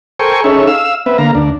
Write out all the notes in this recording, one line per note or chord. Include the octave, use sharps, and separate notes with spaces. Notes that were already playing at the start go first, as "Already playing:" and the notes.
A4 A#4 C5 G5 G#5 C#6
C#4 D#4 G#4 A4 C#5 E5
F5 E6
B3 C4 B4 E5
D3 A#3 F5 A#5
D2 D4